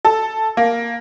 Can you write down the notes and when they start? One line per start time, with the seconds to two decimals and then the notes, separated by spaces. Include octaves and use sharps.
0.05 A4
0.57 A#3